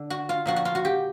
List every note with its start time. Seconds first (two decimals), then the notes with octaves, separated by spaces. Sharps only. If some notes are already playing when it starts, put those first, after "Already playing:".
Already playing: D3
0.10 F#4
0.29 F4
0.46 A#2 F3 F#4
0.56 F#4
0.65 F4
0.75 F#4
0.85 G4